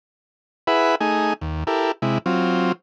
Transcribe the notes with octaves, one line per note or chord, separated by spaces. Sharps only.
E4 G#4 B4 E5 F#5 B5
A3 D#4 G#4 G#5
D#2
E4 G4 A4 A#4
C3 G#3 E4
F#3 C4 F4